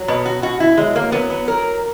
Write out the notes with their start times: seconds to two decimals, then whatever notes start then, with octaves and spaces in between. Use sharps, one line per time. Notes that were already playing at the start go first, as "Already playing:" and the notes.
Already playing: F#3
0.08 B2 B3
0.26 F#4
0.42 B2 F#4
0.60 E4
0.77 F#3 G#3
0.96 A#3
1.12 F#3 B3
1.30 B3
1.48 F#3 A#4